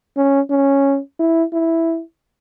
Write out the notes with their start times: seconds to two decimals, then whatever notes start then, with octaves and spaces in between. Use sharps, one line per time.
0.17 C#4
0.50 C#4
1.20 E4
1.53 E4